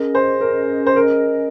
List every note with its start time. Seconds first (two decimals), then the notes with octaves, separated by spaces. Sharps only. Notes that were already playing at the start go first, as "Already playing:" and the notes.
Already playing: C#4 G#4 A#4 D#5
0.15 C5
0.41 A#4
0.86 C5
0.96 A#4